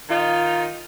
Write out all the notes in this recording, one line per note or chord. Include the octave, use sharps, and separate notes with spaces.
D#3 D#4 F4